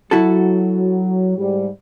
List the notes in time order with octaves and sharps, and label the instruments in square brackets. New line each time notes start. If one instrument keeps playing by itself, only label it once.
[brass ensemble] F#3 [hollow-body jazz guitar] E4 F#4 A4
[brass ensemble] G#2 G3